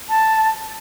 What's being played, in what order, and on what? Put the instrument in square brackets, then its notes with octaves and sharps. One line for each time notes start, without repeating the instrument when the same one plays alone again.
[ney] A5